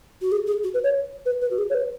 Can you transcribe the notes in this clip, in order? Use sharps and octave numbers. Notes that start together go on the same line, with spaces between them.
F#4
G#4
G#4
F#4
B4
C#5
B4
B4
F#4
G#4
C#5
B4